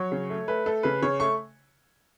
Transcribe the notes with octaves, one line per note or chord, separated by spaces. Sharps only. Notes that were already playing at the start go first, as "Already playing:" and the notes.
Already playing: F#3 C#5
C#3
A3
A3 B4
A3 A4
C#3 B4
C#3 C#5
A3 C#6